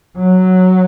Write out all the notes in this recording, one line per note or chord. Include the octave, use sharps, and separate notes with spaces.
F#3